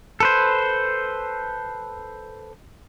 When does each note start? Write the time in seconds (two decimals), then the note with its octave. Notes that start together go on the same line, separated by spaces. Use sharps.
0.20 A4 B4 C5